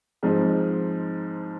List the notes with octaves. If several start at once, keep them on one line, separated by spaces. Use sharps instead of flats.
G#2 F3 G#3 C4 D#4